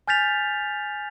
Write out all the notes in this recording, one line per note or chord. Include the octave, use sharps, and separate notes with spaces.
G#5 F6 G6 A6 B6 F7